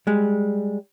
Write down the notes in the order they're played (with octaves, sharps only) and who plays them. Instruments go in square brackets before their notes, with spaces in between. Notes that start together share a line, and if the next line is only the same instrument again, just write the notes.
[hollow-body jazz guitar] G3 G#3